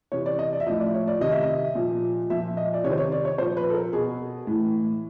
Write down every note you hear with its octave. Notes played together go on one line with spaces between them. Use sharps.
C3 E3 C#5
D5
D#5
D5
E5
A2 F3 D#5
D5
C#5
D5
C3 D#3 D#5
E5
D#5
A#2 F3
A#2 F3 E5
D#5
D5
C3 D#3 C5 C#5
C#5
D5
C#5
A#2 F3 C5
B4
A4
A#4
B2 G#4
A2 E3